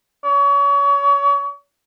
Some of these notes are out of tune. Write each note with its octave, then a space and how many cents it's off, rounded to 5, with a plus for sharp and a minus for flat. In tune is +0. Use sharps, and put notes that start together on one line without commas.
C#5 +35